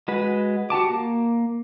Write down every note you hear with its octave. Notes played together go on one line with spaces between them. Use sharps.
G#3 F#4 B4
F#4 G4 A5 D6
A#3